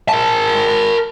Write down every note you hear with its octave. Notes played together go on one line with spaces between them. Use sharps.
A#4 A5